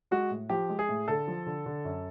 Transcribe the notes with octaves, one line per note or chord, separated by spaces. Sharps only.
G#3 F#4
A2
F3 G4
G#3
G#4
A2
D3 A4
F3
D3
D3
F#2